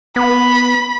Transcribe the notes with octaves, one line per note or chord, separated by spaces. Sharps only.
B3 B5